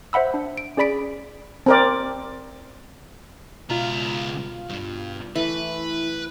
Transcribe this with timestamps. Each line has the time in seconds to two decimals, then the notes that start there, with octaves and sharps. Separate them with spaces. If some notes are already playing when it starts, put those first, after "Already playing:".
0.13 C5 E5 F#5 B5 E6
0.34 D4
0.58 D7
0.77 C#4 G#4 D5 B5 B6 D7
1.66 C4 A#4 D5
3.70 C#2 B2 F4 A#5
4.69 G2
5.35 E3 A3 E4 B4